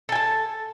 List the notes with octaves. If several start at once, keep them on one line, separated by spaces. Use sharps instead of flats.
A4 G#5 A5